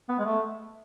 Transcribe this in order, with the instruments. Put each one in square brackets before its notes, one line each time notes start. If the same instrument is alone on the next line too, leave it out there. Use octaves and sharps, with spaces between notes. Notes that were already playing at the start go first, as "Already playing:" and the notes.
[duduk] B3
G#3
A3